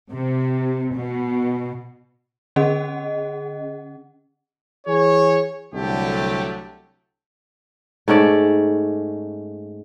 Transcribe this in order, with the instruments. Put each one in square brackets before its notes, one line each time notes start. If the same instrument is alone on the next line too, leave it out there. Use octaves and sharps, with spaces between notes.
[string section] C3
B2
[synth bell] D3 C#4 G#4 D#5 F#5
[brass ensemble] E3 G#4 C#5
C2 D3 F#3 A3 G4
[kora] G#2 A3 C#4 D5